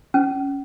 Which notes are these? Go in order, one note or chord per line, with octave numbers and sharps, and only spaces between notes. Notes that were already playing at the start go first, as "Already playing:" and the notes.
C#4